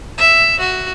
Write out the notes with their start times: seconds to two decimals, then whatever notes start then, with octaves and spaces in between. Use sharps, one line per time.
0.18 E5
0.59 F#4